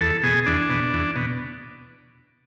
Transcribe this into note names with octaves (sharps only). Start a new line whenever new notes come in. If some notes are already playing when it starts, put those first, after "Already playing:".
E2 A4
B2 G#4
E2 D4
B2
E2
B2